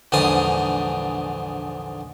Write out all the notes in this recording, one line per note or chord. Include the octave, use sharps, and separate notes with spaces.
A#1 E2 G#2 D3 F5 D#6